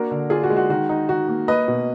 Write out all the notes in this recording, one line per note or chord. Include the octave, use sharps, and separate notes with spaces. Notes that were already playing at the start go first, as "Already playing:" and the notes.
Already playing: A#3 D4 F#4 A#4
D3
D4 F4 G#4
F#4
G#3
F#4
D#3 F#4
D#4
D#3 F#4
A#3
A#3 B4 D#5
B2